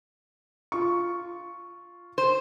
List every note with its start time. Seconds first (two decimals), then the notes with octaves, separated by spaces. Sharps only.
0.72 F4 C#6
2.18 C5